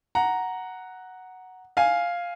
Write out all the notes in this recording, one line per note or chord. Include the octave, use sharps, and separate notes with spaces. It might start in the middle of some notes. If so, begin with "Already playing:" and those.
F#5 A#5
F5 G#5